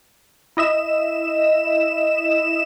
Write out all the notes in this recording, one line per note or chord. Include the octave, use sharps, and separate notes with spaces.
E4 D#5 E5 E7